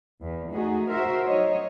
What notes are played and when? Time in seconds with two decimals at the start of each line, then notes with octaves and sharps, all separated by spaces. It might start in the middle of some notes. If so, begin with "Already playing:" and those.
0.20 E2
0.52 A3 D#4 F#4 G#4
0.89 F#4 A#4 C5 E5
1.26 F#3 D#4 C#5 D#5